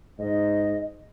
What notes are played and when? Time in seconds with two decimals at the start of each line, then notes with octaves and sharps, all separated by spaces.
0.19 G#2 D#5